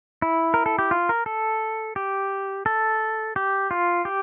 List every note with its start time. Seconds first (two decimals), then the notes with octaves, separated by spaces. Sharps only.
0.22 E4
0.54 A#4
0.66 A4
0.79 G4
0.91 F4
1.09 A#4
1.26 A4
1.96 G4
2.66 A4
3.36 G4
3.71 F4
4.05 G4